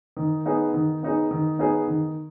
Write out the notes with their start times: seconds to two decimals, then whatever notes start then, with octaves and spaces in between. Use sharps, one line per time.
0.17 D#3
0.46 B3 D#4 G#4
0.74 D#3
1.03 B3 D#4 G#4
1.31 D#3
1.59 B3 D#4 G#4
1.88 D#3